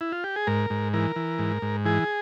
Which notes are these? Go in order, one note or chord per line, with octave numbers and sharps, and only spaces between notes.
E4
F4
G4
G#4
G#2 A#4
G#2
E3 A#4
E3
G#2
G#2
E3 G#4